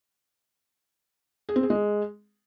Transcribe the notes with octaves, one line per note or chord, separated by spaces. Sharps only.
G#4
C4
G#4
G#3